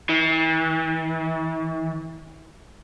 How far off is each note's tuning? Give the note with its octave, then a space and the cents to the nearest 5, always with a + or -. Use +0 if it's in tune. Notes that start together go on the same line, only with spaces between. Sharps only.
E3 -40